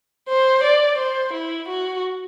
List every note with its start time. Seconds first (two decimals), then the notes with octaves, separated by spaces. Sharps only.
0.28 C5
0.64 D5
0.98 C5
1.33 E4
1.68 F#4